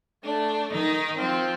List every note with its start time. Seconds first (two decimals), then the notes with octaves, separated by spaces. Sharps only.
0.24 A3 D4
0.72 D#3 D#4
1.19 F3 C4